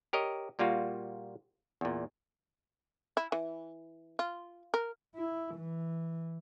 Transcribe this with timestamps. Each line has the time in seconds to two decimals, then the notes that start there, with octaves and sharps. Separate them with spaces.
0.13 G4 A#4 C#5 D#5
0.59 A#2 G3 A#3 F4 F#4
1.81 E2 A#2
3.17 E4
3.32 E3
4.19 F4
4.74 A#4
5.16 E4
5.55 E3